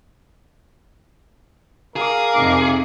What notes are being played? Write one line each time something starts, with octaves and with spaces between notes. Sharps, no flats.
G#4 A#4 F5 D6
F2 C3 D#4